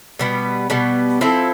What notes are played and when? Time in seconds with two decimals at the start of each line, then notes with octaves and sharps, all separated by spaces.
0.19 B2 G3 B3
0.70 B2 G3 B3
1.21 F3 C4 E4 A4